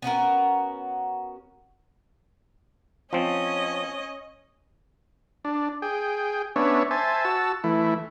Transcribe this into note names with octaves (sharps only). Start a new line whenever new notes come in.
B3 C#4 F#4 A#4
F3 C4 C#4 D#5
D4
G#4 G5
B3 C#4 D4 C#5 E5
C5 E5 G#5 A5
F#4 A5 E6
E3 A3 E4